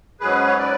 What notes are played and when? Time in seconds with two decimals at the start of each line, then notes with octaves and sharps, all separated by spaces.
0.20 G#2 F#3 C#4 G#4 B4
0.47 C#5
0.59 B4 D5